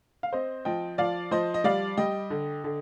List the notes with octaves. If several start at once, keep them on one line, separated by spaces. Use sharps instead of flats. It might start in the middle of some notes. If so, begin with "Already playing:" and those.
F5
C4 C5 D#5
F3 D#5 G5
F3 D5 F5
F3 C5 D#5
D#5
G3 D5 F5
G3 D#5 G5
D3
D3